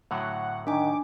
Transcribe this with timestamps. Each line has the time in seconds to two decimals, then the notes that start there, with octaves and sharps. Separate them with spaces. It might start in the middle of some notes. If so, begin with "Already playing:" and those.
0.11 A2 D3 F#3 F#5
0.67 D#3 D4 G#5 D6